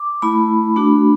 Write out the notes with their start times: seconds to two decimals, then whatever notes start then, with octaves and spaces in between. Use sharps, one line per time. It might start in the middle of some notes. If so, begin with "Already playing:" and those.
Already playing: D6
0.22 A3 E4 B5
0.76 A3 D4 F#4